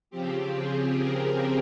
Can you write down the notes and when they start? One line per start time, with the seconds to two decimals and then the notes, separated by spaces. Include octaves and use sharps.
0.11 C#3 F3 C4 G4
0.55 G#4
0.99 A#4